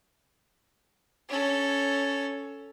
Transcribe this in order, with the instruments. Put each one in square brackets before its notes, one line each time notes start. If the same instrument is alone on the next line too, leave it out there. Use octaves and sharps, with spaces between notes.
[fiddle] C#4 A4